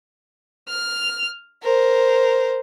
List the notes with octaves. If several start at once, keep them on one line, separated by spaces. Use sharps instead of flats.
F6
A#4 C5